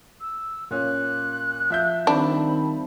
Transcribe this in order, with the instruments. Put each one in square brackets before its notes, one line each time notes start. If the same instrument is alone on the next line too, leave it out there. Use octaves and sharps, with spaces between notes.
[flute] E6
[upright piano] A#2 C#4 [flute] F#6
[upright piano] F3 E5 G6
[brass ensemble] D#3 G3 C4 [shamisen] D4 [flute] B5